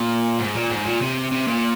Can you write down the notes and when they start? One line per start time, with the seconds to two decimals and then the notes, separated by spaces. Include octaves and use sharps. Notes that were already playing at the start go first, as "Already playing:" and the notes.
Already playing: A#2
0.39 G#2
0.55 A#2
0.70 G#2
0.85 A#2
1.01 C3
1.31 C3
1.47 A#2